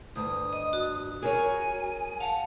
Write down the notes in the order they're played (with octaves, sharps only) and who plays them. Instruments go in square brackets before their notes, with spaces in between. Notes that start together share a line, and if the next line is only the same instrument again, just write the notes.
[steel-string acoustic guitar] D2 G2 [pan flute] D#6
[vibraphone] D#5
F#4
[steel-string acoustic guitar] G#4 A#4 C#5 [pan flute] G#5
[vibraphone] F5 A5 [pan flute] F#5